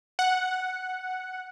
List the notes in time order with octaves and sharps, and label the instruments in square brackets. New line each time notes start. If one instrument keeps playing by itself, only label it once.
[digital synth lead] F#5